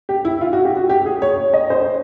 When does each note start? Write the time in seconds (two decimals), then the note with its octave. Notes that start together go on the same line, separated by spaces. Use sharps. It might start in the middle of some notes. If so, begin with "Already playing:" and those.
0.09 G4
0.25 E4
0.41 F4
0.53 F#4
0.65 G4
0.77 F#4
0.89 G4
1.06 G#4
1.22 C#5
1.54 D#5
1.70 C5